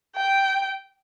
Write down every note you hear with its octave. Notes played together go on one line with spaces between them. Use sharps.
G5